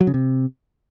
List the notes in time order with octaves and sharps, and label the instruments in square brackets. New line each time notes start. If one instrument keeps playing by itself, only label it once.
[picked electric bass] F#3
C#3
C3